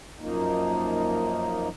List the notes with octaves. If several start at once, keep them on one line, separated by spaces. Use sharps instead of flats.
F#2 F3 A#3 D#4